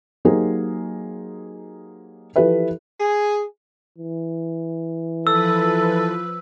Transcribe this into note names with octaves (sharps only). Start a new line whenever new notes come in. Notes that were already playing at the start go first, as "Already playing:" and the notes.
F#3 A#3 D#4 G4 G#4 C5
E3 F3 G4 A4 B4 E5
G#4
E3
F3 A4 B4 E6